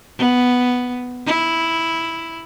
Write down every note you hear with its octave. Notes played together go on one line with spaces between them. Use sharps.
B3
E4